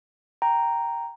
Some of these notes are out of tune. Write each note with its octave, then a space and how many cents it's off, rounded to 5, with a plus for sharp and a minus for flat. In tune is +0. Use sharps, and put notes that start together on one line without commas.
G5 -5 A#5 +0